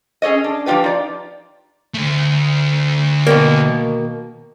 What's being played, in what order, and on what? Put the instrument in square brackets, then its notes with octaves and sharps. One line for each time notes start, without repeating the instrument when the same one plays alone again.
[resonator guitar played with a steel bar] C#4 G#4 A4 C#5 D#5
D4
F3 D4 D#4 F4 G4 B4
D#4 D5
[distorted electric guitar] D2 A3
[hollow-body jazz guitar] B2 D#3 A#3